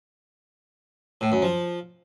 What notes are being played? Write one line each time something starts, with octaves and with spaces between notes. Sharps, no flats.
A2
F#2
F3